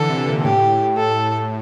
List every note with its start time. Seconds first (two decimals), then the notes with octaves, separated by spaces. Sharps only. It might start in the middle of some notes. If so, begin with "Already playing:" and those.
Already playing: D3 E3 A4
0.09 C3
0.27 A#2
0.38 A#2
0.44 A2 G4
0.97 A4